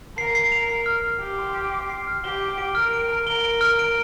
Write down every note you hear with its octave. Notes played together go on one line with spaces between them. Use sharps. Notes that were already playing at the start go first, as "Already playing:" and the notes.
A#4 C7
C7
F7
C7
F6
F6
G4 F6
C6
F6
C7
C7
F6
G4 G7
D7
D7
A#4 F6
D7
F6
A#4 G7
D7
F6
D7